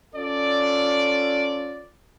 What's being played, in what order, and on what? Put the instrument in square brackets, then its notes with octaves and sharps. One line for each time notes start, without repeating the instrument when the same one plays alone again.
[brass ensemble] C#4 F4 A4 D5